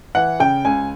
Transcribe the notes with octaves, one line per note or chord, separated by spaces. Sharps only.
E3 F#5
C#3 G5
C#2 G#5